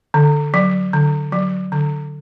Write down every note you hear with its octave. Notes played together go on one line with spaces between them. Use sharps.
D3
F#3
D3
F#3
D3